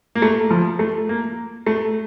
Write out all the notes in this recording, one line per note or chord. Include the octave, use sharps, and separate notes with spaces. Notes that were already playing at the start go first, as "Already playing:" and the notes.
A#3
A3
F3
A3
A#3
A3